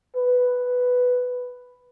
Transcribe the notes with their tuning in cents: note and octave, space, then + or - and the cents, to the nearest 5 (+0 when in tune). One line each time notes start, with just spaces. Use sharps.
B4 +5